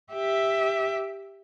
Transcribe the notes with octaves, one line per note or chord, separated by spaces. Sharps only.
G4 E5